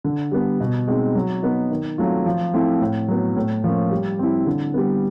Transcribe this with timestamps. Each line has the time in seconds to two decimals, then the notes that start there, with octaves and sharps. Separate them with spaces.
0.04 D3
0.32 G3 B3
0.60 B2
0.88 G#3 C4 D#4
1.15 F#3
1.42 B3 D#4
1.71 D#3
1.98 F#3 A3 C4 F4
2.26 F3
2.54 A3 C4 E4
2.81 A2
3.08 F#3 B3
3.36 A2
3.64 F3 A#3 C#4
3.91 G3
4.19 C4 E4
4.46 D3
4.74 G3 B3